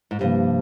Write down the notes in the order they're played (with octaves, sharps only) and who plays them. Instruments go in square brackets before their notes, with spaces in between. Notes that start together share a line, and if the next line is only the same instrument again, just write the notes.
[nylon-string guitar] G#2
[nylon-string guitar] G2 [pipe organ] C3 F3 A#3